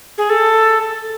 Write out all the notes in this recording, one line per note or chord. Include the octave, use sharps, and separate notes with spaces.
G#4
A4